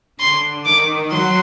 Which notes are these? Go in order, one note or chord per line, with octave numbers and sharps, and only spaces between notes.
D3 C6
D#3 D6
F#3 C6